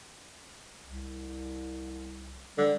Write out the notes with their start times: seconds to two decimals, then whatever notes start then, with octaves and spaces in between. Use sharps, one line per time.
0.85 C2
2.58 D3 G3